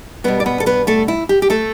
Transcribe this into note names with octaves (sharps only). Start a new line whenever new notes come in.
B2 G3 B3 D4 B4
D5
B3 B4
A4
B3 B4
A3 A4
E4
G4
G4
A3 A4